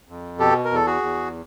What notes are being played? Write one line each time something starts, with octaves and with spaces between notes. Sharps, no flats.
F2
B2 G4 A4
A#4
E2 A4
F#4 G#4
E2